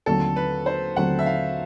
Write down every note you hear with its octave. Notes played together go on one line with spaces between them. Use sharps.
D#2 D3 F#3 A3 C4 A4
B4
C5
D#2 D3 F#3 A3 C4 F#5
E5
F5